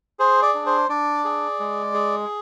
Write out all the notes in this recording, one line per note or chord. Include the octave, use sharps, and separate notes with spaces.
G#4 C5
D5
D4
C5
D4 D5
G#4
G#3
G#4